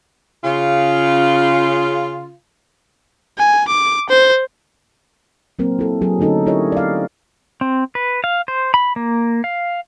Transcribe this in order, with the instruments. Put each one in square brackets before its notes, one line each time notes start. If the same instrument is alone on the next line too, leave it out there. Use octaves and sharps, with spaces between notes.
[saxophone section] C#3 F4
[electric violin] G#5
D6
C5
[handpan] F#3 A#3 C4 A#4
E4 A4
F#3 G#4 A4
D3 A3 C#4 D#4 A4
C#4 E4 G4 A#4 C#5 D#5
D5 F5
[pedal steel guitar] C4
B4
F5
C5
B5
A#3
F5